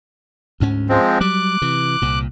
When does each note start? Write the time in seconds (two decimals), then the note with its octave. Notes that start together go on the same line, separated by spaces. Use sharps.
0.60 D2 G#2 C#4
0.89 F3 G#3 C4
1.21 F#3 G3 D6 F#6
1.62 C3 E3
2.02 C2 A#2